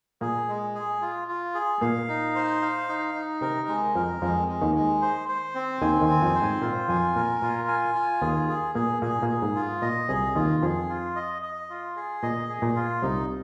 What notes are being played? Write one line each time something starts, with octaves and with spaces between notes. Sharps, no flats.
A#2 A#3 G#4
G#3
G#4
F4
F4
G#4
A#2 A#3 F5
D#4
C5
F5
D#4
D#4
C3 C4 A#4
G#3
F2 F3 A#4
F2 F3 G#3
G#3
D#2 D#3
G#3
C5
C5
C4
D#2 D#3 G#5
D#2 D#3
C4
F2 F3
C5
G#2 G#3
A#2 A#3 F4
F2 F3 G#5
A#2 A#4
A#2 F4
G#5
F4
D#2 D#3 G#4
G#4
A#2 A#3 G#4
A#2 A#3 G#4
A#2 A#3
G#4
G#2
F4
A#2 D#5
C2 C3 G#4
D#2 D#3 F4
F2 F3 G#4
F4
D#5
D#5
F4
G#4
A#2 D#5
G#4
A#2
F4
C2 C3 D#4